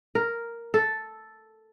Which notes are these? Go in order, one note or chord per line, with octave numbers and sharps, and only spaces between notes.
A#4
A4